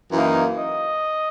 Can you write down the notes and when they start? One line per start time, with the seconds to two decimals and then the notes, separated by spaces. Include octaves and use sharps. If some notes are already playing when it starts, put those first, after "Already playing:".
0.12 F#2 E3 A#3 D#4
0.59 D#5